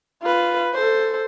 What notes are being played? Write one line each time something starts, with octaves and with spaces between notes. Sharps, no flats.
F4 B4
A4 C5